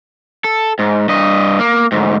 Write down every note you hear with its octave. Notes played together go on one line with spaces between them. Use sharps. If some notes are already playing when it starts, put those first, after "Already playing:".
A4
G#2
G2 D#5
A#3
D2 G#2